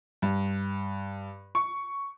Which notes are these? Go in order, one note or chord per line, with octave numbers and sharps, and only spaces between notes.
G2
C#6